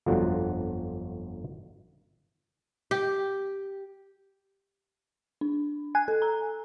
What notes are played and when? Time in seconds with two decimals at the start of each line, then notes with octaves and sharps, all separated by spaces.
0.06 G1 F2 D3 F3 F#3 F#4
2.91 G4
5.41 D4
5.95 G#5 F#6
6.08 A4
6.22 A#5